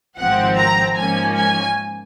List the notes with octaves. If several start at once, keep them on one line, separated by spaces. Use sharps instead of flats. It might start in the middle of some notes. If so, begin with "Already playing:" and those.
G#1 G#2 F3 C4 F#5
A#5
G#2 F3 A#3 C#4 G#5
G#5